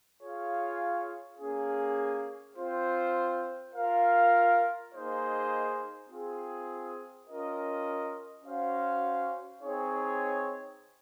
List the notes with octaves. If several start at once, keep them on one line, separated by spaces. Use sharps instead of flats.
F4 G#4 C#5 F5
A#3 C#4 G#4
C4 F4 C5
F4 A#4 F5
A#3 D#4 G#4 C5 D#5
C4 F4 G#4
C#4 F4 A#4 D#5
C#4 F#4 C5 F5
C4 D#4 G#4 C#5